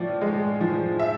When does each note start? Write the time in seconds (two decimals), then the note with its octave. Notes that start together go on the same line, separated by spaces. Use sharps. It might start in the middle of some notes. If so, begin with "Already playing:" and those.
Already playing: A2 F3 D5
0.21 G#3
0.61 F3
0.99 E5